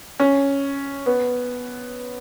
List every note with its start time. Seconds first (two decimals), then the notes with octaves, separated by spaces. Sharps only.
0.20 C#4
1.06 B3